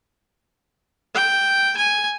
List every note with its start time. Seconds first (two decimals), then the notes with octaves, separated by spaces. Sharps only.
1.14 G5
1.77 G#5